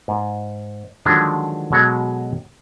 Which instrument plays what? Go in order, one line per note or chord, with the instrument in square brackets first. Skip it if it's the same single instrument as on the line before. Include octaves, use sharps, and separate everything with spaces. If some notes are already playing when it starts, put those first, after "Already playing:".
[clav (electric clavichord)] G#2
D3 D#3 F3 F#3 G#3 D4
B2 F#3 G#3 A4 A#5